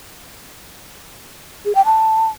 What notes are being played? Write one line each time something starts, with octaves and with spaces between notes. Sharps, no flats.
G#4
G5
A5